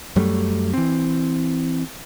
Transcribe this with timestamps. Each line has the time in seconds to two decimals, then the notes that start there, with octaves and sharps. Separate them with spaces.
0.16 F#2 F#3 G3 A3
0.74 E3 C4